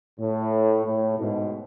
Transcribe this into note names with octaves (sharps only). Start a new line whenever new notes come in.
A2
A2
G#2 B2